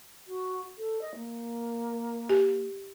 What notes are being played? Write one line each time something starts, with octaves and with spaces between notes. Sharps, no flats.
F#4
A4
D#5
A#3
G4